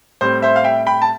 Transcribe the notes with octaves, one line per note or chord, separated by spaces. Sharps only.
A2 G3 C4 C5
C5 E5
F5
E5 G5
G5 B5
A5